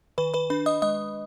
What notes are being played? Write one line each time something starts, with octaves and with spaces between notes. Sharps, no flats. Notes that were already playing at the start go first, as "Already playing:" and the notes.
D#3 B4 B5
B4 B5
D4 B4 B5
D#5 D#6
G#3 D#5 D#6